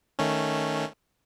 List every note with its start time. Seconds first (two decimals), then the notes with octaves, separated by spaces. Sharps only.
0.19 D#3 A3 C#4